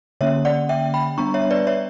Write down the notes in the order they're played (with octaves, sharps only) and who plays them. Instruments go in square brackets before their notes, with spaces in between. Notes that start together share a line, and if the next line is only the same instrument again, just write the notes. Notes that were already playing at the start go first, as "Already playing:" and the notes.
[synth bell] D3 A#3 C#4 C#5 E5
D5 F#5
E5 G5
G5 B5
G3 B3 D4 A#5 C#6
C#5 E5
B4 D5
C#5 E5